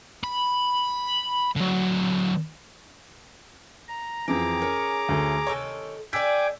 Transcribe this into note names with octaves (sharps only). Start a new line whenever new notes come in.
B5
D3 F#3
A#5
F2 E3 C4 G#4 A#5 D6
C#4 A#4
D2 A3
C3 D#3 A4 C#5 G#5
G#4 D5 G5 G#5 D6 E6 B6